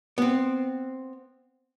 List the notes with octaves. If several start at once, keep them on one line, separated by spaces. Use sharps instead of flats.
B3 C4